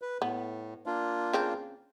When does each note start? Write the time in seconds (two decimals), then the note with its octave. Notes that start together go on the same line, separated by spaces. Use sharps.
0.02 B4
0.22 A2 B3
0.86 A#3 D4 F4
1.33 C#3 C4